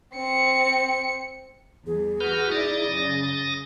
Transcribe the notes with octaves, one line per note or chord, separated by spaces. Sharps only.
C4 C#7
E2 G3 G#4
F#4 B4 F6 G6
D#4 E4 D5 D#6 A6 A#6
F#2 C#3